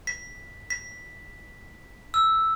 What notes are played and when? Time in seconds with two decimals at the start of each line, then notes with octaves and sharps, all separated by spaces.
0.07 B6
0.70 B6
2.14 E6